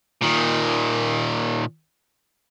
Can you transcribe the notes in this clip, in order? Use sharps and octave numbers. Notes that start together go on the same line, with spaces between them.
A#2 D#3